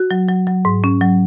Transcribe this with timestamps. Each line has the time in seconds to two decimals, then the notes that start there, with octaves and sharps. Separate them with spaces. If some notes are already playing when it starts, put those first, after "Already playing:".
Already playing: F#4
0.11 F#3
0.29 F#3
0.47 F#3
0.65 G#2
0.84 C#4
1.01 F#3